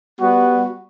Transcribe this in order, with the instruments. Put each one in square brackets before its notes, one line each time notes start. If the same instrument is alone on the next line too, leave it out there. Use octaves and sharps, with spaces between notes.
[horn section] G3 B3 F#4